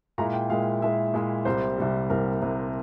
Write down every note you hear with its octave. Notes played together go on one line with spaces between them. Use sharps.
A#2 G#3 E4 A#5
G5
A#2 G#3 E4 F5
A#2 G#3 E4 E5
A#2 G#3 E4
C2 C3 G3 C5
C2 C3 G3
C2 C3 G3 A#4
C2 C3 G3